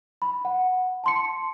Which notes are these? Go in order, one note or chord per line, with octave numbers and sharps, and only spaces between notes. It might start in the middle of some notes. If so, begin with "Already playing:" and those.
B5
F#5
A5 C6 C#7